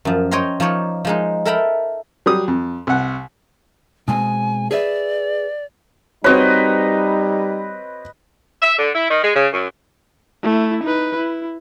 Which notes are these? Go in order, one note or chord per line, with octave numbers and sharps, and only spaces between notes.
F#2 F3
C5 C#5 D#5 G5 A#5 C6
F3 D#4 C#5 D5
F3 G#3 D#4
A4 A#4 E5 G5 A#5 B5
F#3 G3 D#6
F2
C2 F#5
B2 G#3 C4 G#5
G#4 B4 D5 E5
G3 C4 D#4 F#4 B4 C#5 D#5
E5
D3
E4
D#3
G#3
C#3
F#2
A3 E4
D#4 B4
E4